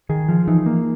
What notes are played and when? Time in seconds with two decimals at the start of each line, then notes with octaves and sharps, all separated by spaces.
0.09 D#3 G#4
0.29 F3
0.48 E3 D#4
0.66 A#3